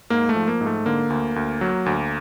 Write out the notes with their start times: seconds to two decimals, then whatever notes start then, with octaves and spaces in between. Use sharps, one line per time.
0.10 G#2 A#3
0.29 A3
0.35 F3
0.48 A#3
0.61 G#2
0.66 A3
0.86 D3 A#3
1.10 D2
1.36 D2
1.61 F#3
1.86 D2